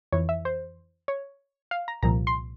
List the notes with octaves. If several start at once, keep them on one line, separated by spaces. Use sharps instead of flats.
F2 E3 C#5
E5
C5
C#5
F5
A#5
C2 A#2 F3 A#5
C6